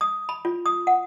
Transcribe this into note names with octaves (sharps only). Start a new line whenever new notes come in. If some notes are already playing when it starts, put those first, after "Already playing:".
D#6
B5
F4
D#6
F#5